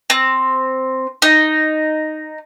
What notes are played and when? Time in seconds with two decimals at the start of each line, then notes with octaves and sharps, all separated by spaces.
0.10 C4
1.22 D#4